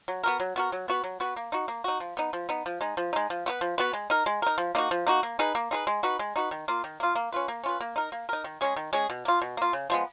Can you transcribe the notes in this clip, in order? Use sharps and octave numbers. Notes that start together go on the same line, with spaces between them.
F#3
B3 F#4 A#4
F#3
B3 F#4 A#4
F#3
B3 F#4 B4
F#3
B3 F#4 B4
A#3
D#4 F#4
A#3
D#4 F#4
F3
B3 D#4
F3
B3 D#4
F3
G#3 D#4
F3
G#3 D#4
F3
B3 F#4 B4
F3
B3 F#4 B4
G#3
D#4 A#4
G#3
D#4 A#4
F3
A#3 D#4 F#4
F3
A#3 D#4 F#4
A#3
D#4 G#4 B4
A#3
D#4 G#4 B4
G#3
D#4 F#4 B4
G#3
D#4 F#4 B4
D#3
A#3 F4
D#3
A#3 F4
A#3
C#4 F4 B4
A#3
C#4 F4 B4
A#3
D#4 A#4
A#3
D#4 A#4
D#3
G#3 C#4 G#4
D#3
G#3 C#4 G#4
B2
A#3 F4
B2
A#3 F4
C#3
F3 G#3 B3